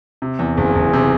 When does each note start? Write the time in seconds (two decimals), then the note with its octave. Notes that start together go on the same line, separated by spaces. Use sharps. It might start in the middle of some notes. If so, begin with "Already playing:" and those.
0.22 C3
0.39 E2
0.57 F#1 G#4
0.75 F#1
0.93 C3